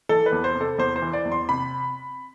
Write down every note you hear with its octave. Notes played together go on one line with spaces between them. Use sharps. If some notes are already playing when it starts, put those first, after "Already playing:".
E3 A4
B4
E2
C5
C3
A4
E2 C5
C5
E3
D5
E2
C6
C3 B5